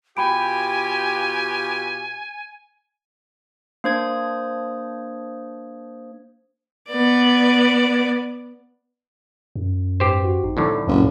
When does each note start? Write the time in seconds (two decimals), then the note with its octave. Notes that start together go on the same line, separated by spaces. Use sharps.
0.17 B2 F4 G4 G5 G#5 B5 D7
3.84 A#3 D4 C5 D#6 G#6
6.90 B3 D5
9.56 F#2
10.00 G#2 G4 B4 C5 D6
10.24 F#4
10.44 G#1 D#4
10.57 C2 A2 D3 E3
10.87 F#1 C#2 G2 A#2